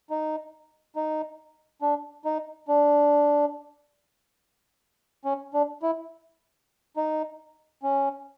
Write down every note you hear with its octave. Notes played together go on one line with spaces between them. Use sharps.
D#4
D#4
D4
D#4
D4
C#4
D4
E4
D#4
C#4